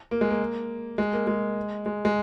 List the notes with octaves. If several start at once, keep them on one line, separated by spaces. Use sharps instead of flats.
A#3
G#3
A#3
G#3
A#3
G#3
G#3
G#3